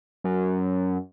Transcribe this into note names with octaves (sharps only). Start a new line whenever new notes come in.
F#2